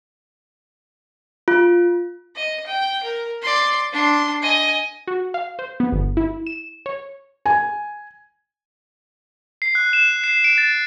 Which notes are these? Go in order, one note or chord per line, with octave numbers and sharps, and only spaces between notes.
F4
D#5
G5
A#4
D5 C6
D4 C6
D#5 G#5
F#4
F5
C5
B3
G1
E4
E7
C#5
G#5
C7
F#6
E7
C7
D7
A6